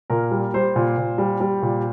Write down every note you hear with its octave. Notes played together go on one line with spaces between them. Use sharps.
A#2 A#4
G3
G3 C5
A#2
A#2
G3
G3
A#2